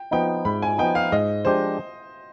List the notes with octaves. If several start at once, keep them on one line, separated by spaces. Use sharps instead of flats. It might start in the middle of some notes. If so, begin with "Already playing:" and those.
Already playing: G5
F3 B3 D#4 G5
G#2 B5
G#5
F3 B3 D#4 G5
F5
G#2 D#5
F3 G#3 D4 G4 C5